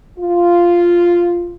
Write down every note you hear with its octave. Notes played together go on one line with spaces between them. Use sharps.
F4